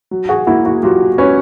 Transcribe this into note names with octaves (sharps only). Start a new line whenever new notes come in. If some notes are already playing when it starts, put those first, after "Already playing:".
F#3
F#4 G#4
A#3 E4 F#4
E4 F#4
F#3 F4 G4
C#4 B4 C#5